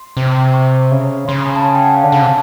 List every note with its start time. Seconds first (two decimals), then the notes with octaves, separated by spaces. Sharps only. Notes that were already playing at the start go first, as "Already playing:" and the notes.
Already playing: C6
0.17 C3
0.54 C#6
0.91 C#3
1.28 C#3 C6
1.38 B5
1.47 A#5
1.56 A5
1.65 G#5
1.75 G5
1.84 F#5
1.94 F5
2.03 D3 A5
2.12 C#3
2.22 C3